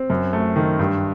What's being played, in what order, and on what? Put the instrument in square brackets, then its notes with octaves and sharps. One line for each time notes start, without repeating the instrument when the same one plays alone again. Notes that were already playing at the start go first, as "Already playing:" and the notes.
Already playing: [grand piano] C4
F#2
A3
D#3
G2